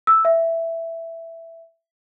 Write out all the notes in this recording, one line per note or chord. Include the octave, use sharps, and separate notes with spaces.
E6
E5